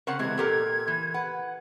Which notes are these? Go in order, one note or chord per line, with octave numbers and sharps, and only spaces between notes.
C#3 C4 A#4 F#5
C3 E3 G#3 G#6
A#2 G4 A4 A#4
E3
B4 F#5